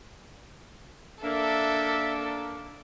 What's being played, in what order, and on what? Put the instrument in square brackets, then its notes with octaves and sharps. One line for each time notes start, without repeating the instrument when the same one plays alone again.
[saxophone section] A#3 D4 [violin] A4 [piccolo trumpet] E5